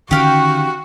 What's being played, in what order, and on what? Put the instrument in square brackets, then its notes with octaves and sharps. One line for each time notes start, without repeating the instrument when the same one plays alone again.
[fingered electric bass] D3 D#3 C#4 [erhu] F#4 [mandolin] G4 F5 G5